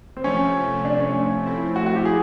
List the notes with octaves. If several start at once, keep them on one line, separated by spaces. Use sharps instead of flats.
C4
C3 F3 A3 C#4
D4
C#4
F3 A3 C4 E4
F#4
F#4
G4
G#4